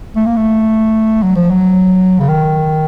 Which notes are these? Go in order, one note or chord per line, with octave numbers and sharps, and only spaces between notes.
A3
A#3
A3
F#3
F3
F#3
C#3
D#3